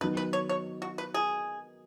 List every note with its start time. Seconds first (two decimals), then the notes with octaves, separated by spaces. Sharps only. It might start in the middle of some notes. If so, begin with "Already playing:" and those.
0.01 D#3 F#3 B3 D#4 B4
0.17 B4
0.33 C#5
0.49 C#5
0.82 F#4
0.98 B4
1.14 G#4